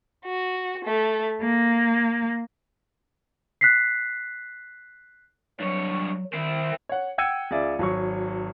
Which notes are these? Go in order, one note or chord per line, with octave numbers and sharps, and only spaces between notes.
F#4
A3
A#3
F#6 B6 C7
G2 F#3 C#5
D#3 C4 E4
C#5 F#5
F#5 G5 E6 G#6 C#7 D#7
C#2 G#4 D5 E5
G#1 F#3 C#6